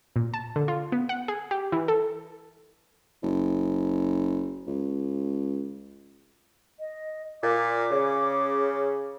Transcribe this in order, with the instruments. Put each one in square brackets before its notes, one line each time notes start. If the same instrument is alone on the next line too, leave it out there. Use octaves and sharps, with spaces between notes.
[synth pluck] A#2
A5
D3
F4
B3
F#5
G#4
G4
E3
A4
[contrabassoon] F#1
C#2
[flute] D#5
[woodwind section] A#2 [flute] D6
[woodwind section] C#3